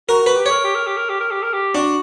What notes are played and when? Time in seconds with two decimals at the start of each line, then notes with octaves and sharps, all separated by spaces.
0.09 F#4 A#4
0.22 F#4 B4
0.36 G4
0.46 A#4 C#5
0.64 G4
0.75 A#4
0.86 G4
0.97 A#4
1.09 G4
1.20 A#4
1.31 G4
1.43 A#4
1.53 G4
1.75 D4 F#4